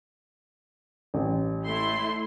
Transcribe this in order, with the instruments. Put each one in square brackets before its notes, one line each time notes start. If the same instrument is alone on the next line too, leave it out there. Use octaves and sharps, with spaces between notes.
[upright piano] A1
[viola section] A3 E4 C6